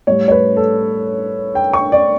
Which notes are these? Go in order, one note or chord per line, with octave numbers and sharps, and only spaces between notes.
A2 G3 C#5
C#5
B4
A4
G5
C#6
D5